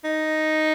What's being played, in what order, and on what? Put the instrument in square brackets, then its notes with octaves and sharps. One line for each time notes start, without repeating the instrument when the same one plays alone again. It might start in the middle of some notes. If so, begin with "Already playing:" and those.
[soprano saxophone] D#4